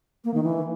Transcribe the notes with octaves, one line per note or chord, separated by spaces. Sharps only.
A#3
D#3
E3